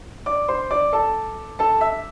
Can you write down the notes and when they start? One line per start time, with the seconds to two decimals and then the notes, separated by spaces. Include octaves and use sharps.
0.26 D5 D6
0.48 C5 C6
0.71 D5 D6
0.93 A4 A5
1.59 A4 A5
1.81 E5 E6